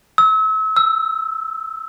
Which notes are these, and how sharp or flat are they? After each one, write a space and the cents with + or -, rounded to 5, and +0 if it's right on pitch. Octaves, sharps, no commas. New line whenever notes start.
E6 -35
E6 +5